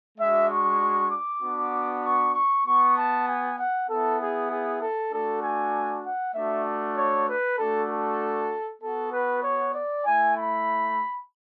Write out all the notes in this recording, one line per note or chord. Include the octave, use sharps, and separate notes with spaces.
G#3 D4 F#4 E5
C#6
D6
B3 D4 F#4
C#6
C#6
B3 F#4 C#6
A5
G#5
F#5
B3 E4 A4
G#4
G#4
A4
A3 D4 F#4 A4
G#5
F#5
A3 D4 F#4 E5
C#5
B4
A3 D4 F#4 A4
A4
B3 F#4 A4
B4
C#5
D5
A3 E4 G#5
B5